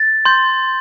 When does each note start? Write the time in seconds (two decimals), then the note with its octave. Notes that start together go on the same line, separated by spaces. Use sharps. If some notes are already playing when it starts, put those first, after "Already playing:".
Already playing: A6
0.25 C6 G6